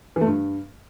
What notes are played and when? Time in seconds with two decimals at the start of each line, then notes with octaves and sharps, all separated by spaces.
0.16 E3
0.21 A3
0.26 G2